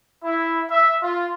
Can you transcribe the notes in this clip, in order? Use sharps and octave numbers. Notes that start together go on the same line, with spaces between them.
E4
E5
F4